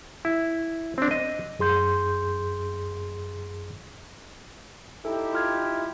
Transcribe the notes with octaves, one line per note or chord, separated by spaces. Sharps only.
E4
C4 D4
D#5
F#2 G#4 C6 G6
D#4 E4 G4 A4
F4 F6 G#6